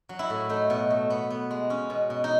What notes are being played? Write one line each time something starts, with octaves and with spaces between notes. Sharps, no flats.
F#3
E4
A2
A3 D#4
B2
A3
B3
B3
G#3
C#4
B2
B2
D#4